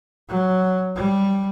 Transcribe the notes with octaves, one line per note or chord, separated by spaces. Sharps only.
F#3
G3